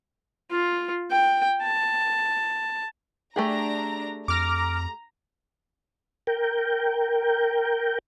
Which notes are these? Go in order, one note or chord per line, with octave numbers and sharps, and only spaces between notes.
F4
G5
A5
A3 D4 G4 G#4 A#5
F2 A#5 D6 F6 A#6
A#4 G5